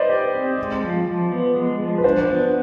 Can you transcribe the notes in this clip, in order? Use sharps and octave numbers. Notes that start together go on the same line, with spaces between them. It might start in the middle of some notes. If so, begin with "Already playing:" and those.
Already playing: B4 C5 D5 D#5
G4
C4
G#3
F3
F3
B3
G#3
F3
B4
D4 C5
B3